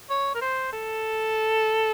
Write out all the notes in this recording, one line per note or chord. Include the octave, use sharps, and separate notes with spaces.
C#5
A#4
C5
A4